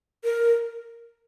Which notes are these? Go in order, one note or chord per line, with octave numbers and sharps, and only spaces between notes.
A#4